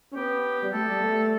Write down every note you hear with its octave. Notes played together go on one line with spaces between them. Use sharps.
C#4
B3 G4
G3
A3 A4
G3
A3